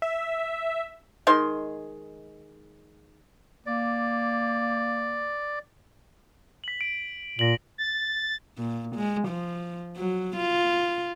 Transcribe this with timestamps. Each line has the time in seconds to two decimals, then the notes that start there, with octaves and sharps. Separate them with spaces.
0.02 E5
1.27 D#3 G#3 C6
3.66 A#3 D5
6.64 B6 F#7
6.81 D7
7.39 A#2 A#6 F#7
7.78 A6
8.58 A#2
8.95 G#3
9.27 F3
9.97 F#3
10.36 F4